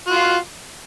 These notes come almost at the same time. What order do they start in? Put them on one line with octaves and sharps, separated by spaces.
F#4 F4 F5